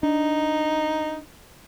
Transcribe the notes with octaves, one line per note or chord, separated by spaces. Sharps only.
D4 D#4